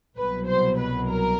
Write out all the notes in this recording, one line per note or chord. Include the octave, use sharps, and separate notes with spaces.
C2 B2 F#3 B4
C5
B4
A#4